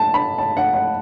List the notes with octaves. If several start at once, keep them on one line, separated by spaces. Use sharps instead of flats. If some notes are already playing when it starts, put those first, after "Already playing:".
Already playing: A5
B5
A5
F#5
F#5